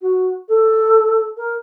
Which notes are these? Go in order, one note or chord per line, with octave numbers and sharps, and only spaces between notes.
F#4
A4
A#4